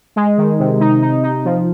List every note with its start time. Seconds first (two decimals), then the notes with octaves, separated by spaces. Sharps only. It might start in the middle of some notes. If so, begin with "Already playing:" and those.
0.16 G#3
0.38 D#3
0.59 C3
0.80 D#4
1.02 D#4
1.23 D#4
1.45 F3